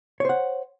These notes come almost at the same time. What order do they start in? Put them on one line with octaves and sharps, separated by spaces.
C#5 C5 F#5